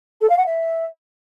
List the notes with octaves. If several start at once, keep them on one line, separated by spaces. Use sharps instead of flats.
A4
F5
F#5
E5